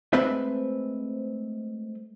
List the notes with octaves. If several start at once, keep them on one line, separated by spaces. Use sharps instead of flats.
G#3 A3 C4 B4 C5 E5